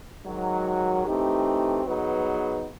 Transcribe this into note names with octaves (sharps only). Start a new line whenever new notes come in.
G#2 D#3 F#3
E3 A3 C4 D#4 G4
F#3 B3 D#4 G#4 B4